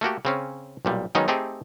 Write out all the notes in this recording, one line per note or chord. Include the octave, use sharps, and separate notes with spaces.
A3 A#3 F#4 G4
C#3 C4 C#4
B1 A#2 G3
D#3 F#3 G#3 B3 C#4 D#4
A3 C4 D#4 G4 G#4